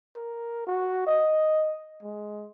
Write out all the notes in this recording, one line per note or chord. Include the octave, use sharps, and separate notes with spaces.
A#4
F#4
D#5
G#3